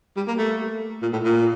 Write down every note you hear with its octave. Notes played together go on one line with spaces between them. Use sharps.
G3
A#3
A3
A#2
A2
A#2